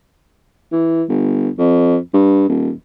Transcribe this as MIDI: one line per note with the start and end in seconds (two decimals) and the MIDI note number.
0.72 1.03 52
1.09 1.49 31
1.58 1.97 41
2.13 2.49 43
2.49 2.71 27